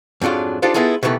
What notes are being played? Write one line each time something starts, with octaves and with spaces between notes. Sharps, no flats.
F2 G#2 F#3 D4 F4
D4 D#4 F4 G4 A4 C5
G#3 B3 E4 F4 G#4 A4
B2 D#3 E3 A3 G4